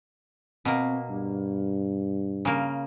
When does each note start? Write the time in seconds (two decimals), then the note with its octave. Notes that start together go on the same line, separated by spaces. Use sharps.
0.65 B2 A#3 C4
1.10 G2
2.45 C#3 A#3